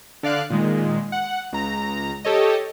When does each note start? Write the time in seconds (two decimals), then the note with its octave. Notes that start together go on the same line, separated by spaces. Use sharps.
0.23 D3 D5 F5 F#6
0.50 A#2 D#3 G#3
1.12 F#5
1.53 C#2 A#5
2.25 G4 A4 C#5 D#5